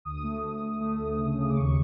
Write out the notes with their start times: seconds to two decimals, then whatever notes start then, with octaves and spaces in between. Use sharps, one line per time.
0.05 D2 D#6
0.23 A3
0.44 D2
0.62 D2
0.81 A3
0.99 D2
1.18 C#3
1.38 C#3
1.50 D6
1.56 D#2 C#6